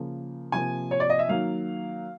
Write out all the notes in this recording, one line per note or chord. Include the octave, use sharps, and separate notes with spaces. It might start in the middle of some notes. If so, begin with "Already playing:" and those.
Already playing: C#3 F3 A#3
C3 F3 A#3 G#5
C#5
D5
D#5
E5
D#3 F#3 A#3 F5